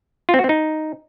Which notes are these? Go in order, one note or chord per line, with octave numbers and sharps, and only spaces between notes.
F4
C4
F#4
C4
D#4